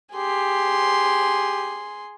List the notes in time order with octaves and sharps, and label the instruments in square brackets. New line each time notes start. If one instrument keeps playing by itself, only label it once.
[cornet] G4 [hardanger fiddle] G#4 C6